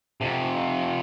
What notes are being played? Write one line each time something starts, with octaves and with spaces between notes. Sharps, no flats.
F2 C3